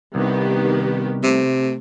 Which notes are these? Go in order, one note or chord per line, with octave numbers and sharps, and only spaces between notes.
C2 D#3 B3 G4
C3 A3